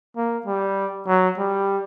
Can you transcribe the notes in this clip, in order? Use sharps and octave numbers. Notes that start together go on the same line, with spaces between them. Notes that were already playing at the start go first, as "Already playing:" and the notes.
A#3
G3
F#3
G3